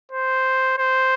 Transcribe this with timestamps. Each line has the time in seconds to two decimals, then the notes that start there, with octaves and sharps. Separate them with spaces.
0.12 C5
0.78 C5